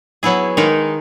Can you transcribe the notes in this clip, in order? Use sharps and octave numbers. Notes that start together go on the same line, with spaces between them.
F#3 B3 E4 G#4
D#3 G#3 D#4 A#4